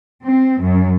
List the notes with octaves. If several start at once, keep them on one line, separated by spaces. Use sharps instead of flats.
C4
F#2